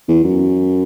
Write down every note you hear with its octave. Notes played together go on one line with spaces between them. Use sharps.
E2
F#2